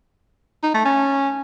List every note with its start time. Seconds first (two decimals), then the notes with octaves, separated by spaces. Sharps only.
0.63 D#4
0.74 A3
0.85 C#4